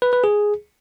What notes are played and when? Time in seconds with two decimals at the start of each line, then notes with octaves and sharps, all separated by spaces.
0.02 B4
0.13 B4
0.24 G#4